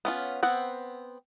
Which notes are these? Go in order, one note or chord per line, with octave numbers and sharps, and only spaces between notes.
B3 C#4 F4
B3 C4 F#5